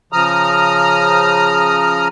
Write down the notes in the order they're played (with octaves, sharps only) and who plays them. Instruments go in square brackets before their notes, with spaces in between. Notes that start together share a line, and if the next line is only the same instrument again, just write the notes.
[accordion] C#3 F3 A#5 D#6 F6